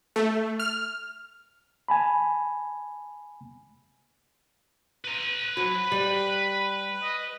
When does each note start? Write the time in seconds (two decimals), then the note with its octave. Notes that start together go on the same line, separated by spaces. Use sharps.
0.16 A3
0.60 F6
1.88 G#5 A5 B5
5.05 B4 A#5
5.57 F#3 B5
5.92 G3
7.02 D#5